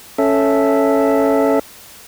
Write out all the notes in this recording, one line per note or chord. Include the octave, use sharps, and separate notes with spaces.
C#4 A4 E5